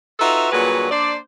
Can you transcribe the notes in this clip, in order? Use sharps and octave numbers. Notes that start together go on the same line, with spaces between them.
D#4 F4 F#4 A4 B4 E5
G2 A#2 F#3 F#4 G#4 B4
A#3 D4 C5 D5